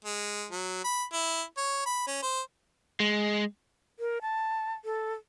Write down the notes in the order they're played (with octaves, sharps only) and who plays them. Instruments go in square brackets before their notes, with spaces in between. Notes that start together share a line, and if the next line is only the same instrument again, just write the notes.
[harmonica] G#3
F#3
B5
E4
C#5
B5
C#4
C5
[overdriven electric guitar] G#3
[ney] A#4
A5
A4